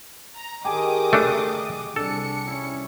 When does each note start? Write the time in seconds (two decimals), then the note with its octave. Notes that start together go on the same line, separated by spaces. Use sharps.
0.35 A#5
0.65 D#3 G4 G#4 D#5 A5 D6 D#6
1.13 A3 D4
1.96 C2 D4 A4 C#7
2.47 C#4 E4